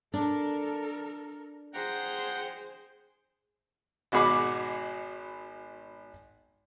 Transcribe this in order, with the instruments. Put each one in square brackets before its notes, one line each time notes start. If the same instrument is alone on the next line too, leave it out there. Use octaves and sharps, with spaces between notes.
[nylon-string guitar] D4 [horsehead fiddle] A4 A#4
[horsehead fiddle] G#4 C5 [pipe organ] F#5 G5 A#5
[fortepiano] G#1 B2 F#4 G#4 B5 D6